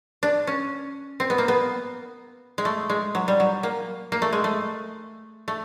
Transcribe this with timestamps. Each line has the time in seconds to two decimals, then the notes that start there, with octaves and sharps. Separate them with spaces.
0.23 D4
0.47 C#4
1.20 C4
1.30 B3
1.38 A#3
1.48 B3
2.58 G#3
2.65 A3
2.90 G#3
3.15 F#3
3.28 G3
3.40 F#3
3.63 A#3
4.12 A#3
4.22 A3
4.33 G#3
4.44 A3
5.48 A3